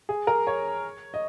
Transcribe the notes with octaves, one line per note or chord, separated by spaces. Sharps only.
G#4
A#4
C#5
D#5